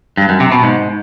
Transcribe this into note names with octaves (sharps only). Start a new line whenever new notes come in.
G2
F#2
C3
B2
G#2